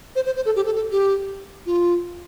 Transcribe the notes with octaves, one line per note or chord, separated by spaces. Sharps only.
C5
C5
C5
A4
G4
A4
A4
G4
F4